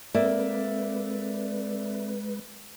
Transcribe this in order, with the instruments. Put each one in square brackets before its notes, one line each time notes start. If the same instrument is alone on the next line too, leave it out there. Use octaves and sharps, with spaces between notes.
[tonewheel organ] G#3 B4 [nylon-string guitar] A#3 [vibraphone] C4 A4 [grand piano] D5 E5